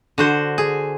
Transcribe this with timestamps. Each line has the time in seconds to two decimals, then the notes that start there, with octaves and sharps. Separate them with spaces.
0.18 D3 F#4 C5
0.58 G#4